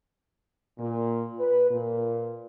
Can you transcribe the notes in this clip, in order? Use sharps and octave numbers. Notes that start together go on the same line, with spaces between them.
A#2
B4
A#2